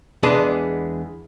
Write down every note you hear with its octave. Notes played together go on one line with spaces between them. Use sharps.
E2 G#3 B3 D4 G#4 A5